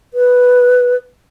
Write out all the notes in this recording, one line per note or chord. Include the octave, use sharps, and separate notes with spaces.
B4